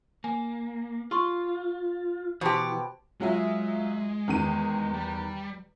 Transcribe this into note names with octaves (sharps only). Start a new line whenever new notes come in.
A#3 G#5
F4 G4 C6 C#6
B2 E3 G4 C5 A5 C6
F#3 G#3 F4 E5
E2 D#3 D#7
G3